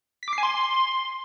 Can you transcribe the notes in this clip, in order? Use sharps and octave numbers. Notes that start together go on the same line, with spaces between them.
B6
D6
C7
G#5
C6